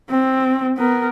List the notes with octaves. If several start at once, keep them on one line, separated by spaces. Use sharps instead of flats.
C4
B3 A#4